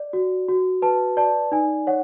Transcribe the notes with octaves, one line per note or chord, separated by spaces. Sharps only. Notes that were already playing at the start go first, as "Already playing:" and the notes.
Already playing: D5
F#4
F#4
B4 A5
D5 A5
D#4 G#5
C#5 F#5